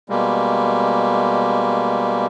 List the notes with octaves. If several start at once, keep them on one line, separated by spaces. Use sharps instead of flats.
B2 G3 G#3 A#3